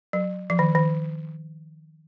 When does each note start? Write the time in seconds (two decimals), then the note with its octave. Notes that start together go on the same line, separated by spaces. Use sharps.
0.13 F#3
0.50 F3
0.59 D#3
0.75 D#3